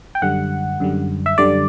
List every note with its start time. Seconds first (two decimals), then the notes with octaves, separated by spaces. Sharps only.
0.15 G5
0.22 F#2 D3 G3 F#5
0.80 F#2 D3 G3
1.26 E5
1.38 F#2 D3 G3 D5